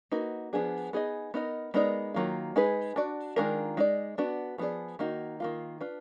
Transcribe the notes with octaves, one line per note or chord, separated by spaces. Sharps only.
A#3 D#4 F#4 B4
F3 B3 D4 G#4
B3 D#4 G#4 D#5
B3 D#4 A#4 D#5
G#3 B3 D#4 A#4 D5
D#3 F#3 A#3 F4
G#3 D#4 G#4 B4
D4 F#4 D5
D#3 G#3 D4 F4 A#4
G#3 D#4 F#4 D5
B3 D4 F#4 D5
F3 B3 F4 G#4 D5
D#3 A#3 D#4 F#4
D#3 A#3 F4
D4 F4 B4